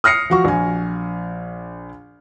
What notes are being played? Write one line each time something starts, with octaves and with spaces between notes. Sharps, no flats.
D#6 F6 A#6 C7 C#7
F3 F#4 C#6
A#1 G#5